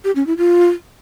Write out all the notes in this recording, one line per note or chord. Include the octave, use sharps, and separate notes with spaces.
G4
C#4
E4
F4